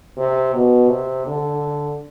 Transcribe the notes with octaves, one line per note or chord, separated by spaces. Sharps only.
C3
B2
C3
D3